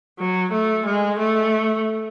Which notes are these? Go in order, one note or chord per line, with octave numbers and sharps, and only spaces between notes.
F#3
A3
G#3
A3